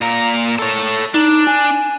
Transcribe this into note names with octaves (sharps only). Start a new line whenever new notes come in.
A#2 A#4
A4 C#5
D4 D#4
G#5